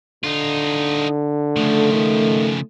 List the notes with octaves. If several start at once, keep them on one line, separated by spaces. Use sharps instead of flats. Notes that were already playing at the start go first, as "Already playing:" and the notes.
D3 D#4 F4
C#3 F3 A3
D#3